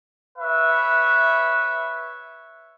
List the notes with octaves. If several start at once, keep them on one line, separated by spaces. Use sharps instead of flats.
B4 C#5 E5